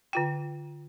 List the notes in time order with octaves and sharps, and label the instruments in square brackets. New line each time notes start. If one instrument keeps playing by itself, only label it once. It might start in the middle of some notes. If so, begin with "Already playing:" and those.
[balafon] D3 F4 G5